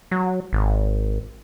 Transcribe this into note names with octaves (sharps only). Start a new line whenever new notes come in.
F#3
G#1